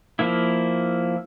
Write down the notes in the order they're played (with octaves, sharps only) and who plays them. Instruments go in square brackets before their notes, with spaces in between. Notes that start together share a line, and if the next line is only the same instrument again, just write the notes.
[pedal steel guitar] F3 A#3 E4